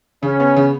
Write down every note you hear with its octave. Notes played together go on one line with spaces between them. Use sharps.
C#3 C#4
B3
C#3